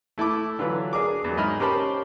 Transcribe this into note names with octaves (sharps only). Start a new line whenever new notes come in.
A3 E4 A5 D6
D3 E3 F#3 F4 B4
D4 G#4 A#4 D6
E2 F#3
G#2 D#5 E5 B5 F6
C#4 G4 A#4 C5 A5 B5